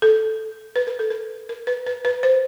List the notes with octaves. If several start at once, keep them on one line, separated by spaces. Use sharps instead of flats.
A4
B4
A#4
A4
A#4
A#4
B4
B4
B4
C5